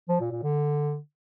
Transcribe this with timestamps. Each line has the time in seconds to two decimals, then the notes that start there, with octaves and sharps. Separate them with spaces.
0.09 F3
0.20 A#2
0.32 A#2
0.43 D3